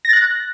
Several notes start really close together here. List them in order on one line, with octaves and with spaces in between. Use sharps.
A#6 A6 F#6